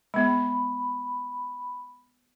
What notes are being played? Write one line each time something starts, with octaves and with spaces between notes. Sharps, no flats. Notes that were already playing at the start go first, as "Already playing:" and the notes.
G#3 B3 B5